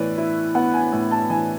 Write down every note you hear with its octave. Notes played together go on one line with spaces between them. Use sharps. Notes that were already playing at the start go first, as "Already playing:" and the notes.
Already playing: A2 E3 B3 B4 C#5 D5
E4
B3 F#5
G#5
A2
A5
E3 G#5